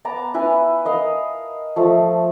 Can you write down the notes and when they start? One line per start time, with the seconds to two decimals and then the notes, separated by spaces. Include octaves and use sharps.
0.05 B3 A5 A#5 D6
0.34 E4 B4 G#5
0.85 A#4 D#5 F5
1.76 F3 A3 E5